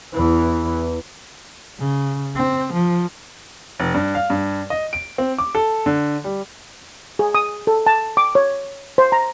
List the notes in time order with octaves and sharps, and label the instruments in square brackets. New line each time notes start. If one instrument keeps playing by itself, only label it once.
[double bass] E2 E3
C#3
C4
F3
[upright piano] F1
G2
F5
G2
D#5
D7
C4
D6
A4
D3
G3
[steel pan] G#4
D#6
A4
A5
D6
C#5
C5
A#5